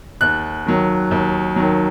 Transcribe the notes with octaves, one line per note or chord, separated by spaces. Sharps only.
D#2 F#6
D#3 F#3
D#2
D#3 F#3